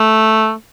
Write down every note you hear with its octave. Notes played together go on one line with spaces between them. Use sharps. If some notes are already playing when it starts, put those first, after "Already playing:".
Already playing: A3